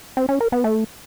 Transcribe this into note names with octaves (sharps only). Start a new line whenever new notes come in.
C4
C#4
A#4
B3
A3